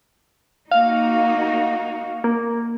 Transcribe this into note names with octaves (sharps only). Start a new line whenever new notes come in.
A#3 D#4 F#4 F5
A#3